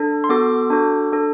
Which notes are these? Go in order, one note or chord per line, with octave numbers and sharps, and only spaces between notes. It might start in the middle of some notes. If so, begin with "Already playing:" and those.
Already playing: D4 A4
C6
B3 F#4 A4 D6
D4 F#4 A4
D4 A4